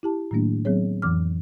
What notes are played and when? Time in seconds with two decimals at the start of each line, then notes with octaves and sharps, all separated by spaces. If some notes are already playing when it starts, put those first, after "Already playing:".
0.03 E4 G4 A5
0.31 A2 D#3 F#3 A3 A#3 D4
0.65 F#3 B3 C4 G#4 C#5
1.02 F2 E3 D6 F6